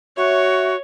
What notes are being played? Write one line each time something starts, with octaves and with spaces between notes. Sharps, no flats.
F#4 C#5 E5 C#6